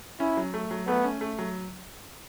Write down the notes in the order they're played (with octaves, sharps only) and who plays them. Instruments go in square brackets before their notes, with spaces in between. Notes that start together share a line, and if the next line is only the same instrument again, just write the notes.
[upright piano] C#4 [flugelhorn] E4
[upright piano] F#3
A3
F#3
[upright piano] A3 [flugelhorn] B3
[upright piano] C#4
A3
F#3